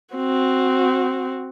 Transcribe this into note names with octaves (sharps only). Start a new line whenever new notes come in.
C4 F#4